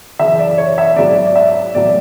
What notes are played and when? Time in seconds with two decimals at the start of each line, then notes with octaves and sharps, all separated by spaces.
0.19 F#2 C#3 E3 E5
0.39 D5
0.58 C#5
0.78 E5
0.96 G#2 F#3 D5
1.27 D5
1.35 E5
1.74 A2 F#3 D5